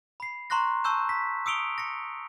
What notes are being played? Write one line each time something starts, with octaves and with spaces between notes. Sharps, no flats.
B5 C7
A#5 C6 C#6 F#6 A#6
A5 C#6 E6 G6 E7
B6
D#6 E6 C#7 D7 F7 G7
A#6 C#7